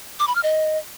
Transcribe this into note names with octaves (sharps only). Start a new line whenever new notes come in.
D6
B5
F6
D#5